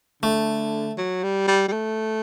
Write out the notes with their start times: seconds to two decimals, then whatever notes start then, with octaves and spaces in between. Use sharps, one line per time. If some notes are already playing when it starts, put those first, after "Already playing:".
0.23 D3 A3
0.98 F#3
1.23 G3
1.48 G3
1.68 G3
1.72 A3